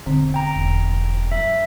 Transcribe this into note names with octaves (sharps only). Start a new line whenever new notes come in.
E1 B2 D3 C4
G5 A#5
E1
F#2 E5